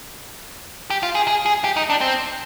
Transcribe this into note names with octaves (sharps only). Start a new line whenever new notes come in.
G4
F4
G#4
G#4
G#4
G4
D#4
D4
C4